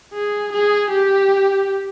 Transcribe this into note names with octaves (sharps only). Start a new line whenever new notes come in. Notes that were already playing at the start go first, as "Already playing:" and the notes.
G#4
G#4
G4